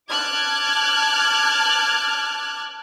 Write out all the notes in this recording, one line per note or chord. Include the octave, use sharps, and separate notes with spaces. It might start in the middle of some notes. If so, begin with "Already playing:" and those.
A5 D6 F6 F#6 G#6